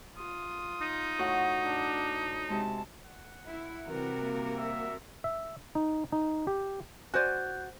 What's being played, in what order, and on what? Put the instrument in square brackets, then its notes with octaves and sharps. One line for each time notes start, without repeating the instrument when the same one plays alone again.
[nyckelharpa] F4 D#6
[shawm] D#4
[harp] A2 F#4 F#5
[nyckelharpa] D4
[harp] C3 G#3 [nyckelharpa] A5
[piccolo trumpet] F#5
[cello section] E4
[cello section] C3 G3 F#4 [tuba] E3 [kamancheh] A#4
[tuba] A#3
[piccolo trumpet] E5
[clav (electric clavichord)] E5
D#4
D#4
G4
[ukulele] F#4 D5 [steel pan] C5 G#5 [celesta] F#6 G6